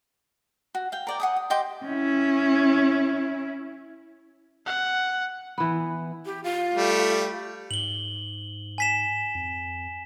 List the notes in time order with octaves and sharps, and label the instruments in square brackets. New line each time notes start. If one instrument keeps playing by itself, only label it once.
[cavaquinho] F#4
F5 G5
A#4 D5 G5
F#5 G#5 D#6
D#6
G4 D#5 G5 C6
[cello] C#4 E4
[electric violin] F#5
[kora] E3 B3
[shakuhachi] G4
F4
[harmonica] G3 A3
[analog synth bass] G#2 [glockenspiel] F#7 G7
[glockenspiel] G#5 B6 E7
[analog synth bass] F2